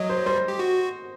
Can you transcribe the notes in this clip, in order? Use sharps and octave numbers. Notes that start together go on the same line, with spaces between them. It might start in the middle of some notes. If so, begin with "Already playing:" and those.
Already playing: F#3 D#5
C5
G3 C5
G4
F#4